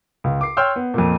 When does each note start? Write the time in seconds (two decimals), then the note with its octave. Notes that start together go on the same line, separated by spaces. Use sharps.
0.24 C#2
0.41 D6 C7
0.57 C#5 G5 C6 E6 F6 G6
0.76 B3
0.94 F2 A#2